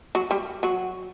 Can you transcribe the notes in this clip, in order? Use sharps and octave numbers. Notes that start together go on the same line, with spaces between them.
F#3 F#4
G3 G4
F#3 F#4